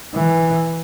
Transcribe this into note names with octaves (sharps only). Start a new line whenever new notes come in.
E3